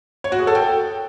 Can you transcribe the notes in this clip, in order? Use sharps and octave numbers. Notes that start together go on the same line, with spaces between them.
C#5
F#4
G#4
A4
G5